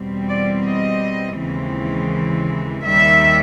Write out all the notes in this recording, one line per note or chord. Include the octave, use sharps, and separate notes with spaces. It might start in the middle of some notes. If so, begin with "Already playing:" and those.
Already playing: E2 B2 G3 C4
D5
D#5
D#2 C#3 E3 G#3 C4
D#2 D#3 G3 E5